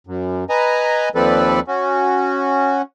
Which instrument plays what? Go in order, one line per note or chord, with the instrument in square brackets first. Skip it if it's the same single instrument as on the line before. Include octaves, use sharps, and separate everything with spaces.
[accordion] F#2
B4 D#5 G#5 A#5
D#2 F3 C4 A4 B4 D5
C#4 F#4